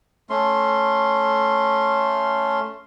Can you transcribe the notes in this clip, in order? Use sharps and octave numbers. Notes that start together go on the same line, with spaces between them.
A3 C#4 C6